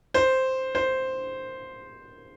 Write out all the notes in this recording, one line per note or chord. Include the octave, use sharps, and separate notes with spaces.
C5
C5